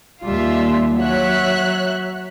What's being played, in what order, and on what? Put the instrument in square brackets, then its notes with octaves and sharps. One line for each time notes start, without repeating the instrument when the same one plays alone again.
[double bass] D#2 G3 [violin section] F4 E5
[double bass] F#3 [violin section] C#5 E5 F#6